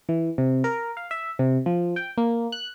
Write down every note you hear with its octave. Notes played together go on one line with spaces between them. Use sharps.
E3
C3
A#4
F5
E5
C3
F3
G5
A#3
F#6